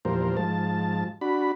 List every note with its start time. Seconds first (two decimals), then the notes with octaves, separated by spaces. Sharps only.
0.05 E2 A#2 F3 G3 A#4 C5
0.37 G#2 F3 A5
1.21 D4 F#4 B5